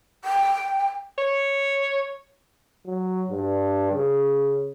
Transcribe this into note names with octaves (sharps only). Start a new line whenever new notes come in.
G5
C#5
F#3
G2
C#3